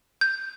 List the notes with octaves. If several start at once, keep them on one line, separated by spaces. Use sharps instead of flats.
G6